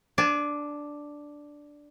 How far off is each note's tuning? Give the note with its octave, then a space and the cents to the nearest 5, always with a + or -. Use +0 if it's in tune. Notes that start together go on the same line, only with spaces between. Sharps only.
D4 +0 G#5 +40